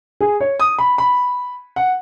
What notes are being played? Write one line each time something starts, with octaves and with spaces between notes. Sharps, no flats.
G#4
C#5
D#6
B5
B5
F#5